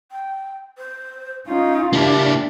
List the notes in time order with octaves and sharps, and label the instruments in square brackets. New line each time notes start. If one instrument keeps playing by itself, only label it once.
[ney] G5
C5
[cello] C#4 F4 [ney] D#4
[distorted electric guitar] A#3 E4 [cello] D4 [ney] G4